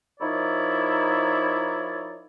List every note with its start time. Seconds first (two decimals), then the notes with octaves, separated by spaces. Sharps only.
0.20 F3 D#4 E4 A#4 C#5 D5